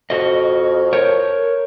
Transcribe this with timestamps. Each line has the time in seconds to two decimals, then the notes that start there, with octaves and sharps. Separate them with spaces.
0.10 F2 F#4 D#5
0.93 A#4 C#5